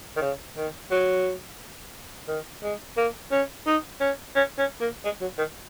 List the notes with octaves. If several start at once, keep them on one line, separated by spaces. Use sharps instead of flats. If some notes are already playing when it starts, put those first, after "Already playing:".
D#3
C#3
D#3
F#3
D#3
G#3
A#3
C#4
D#4
C#4
C#4
C#4
A#3
G#3
F#3
D#3